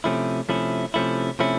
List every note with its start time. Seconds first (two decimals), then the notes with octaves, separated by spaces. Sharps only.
0.04 C3 F3 A3 C#4 E4
0.49 C3 F3 A3 C#4 E4
0.94 C3 F3 A3 C#4 E4
1.39 C3 F3 A3 C#4 E4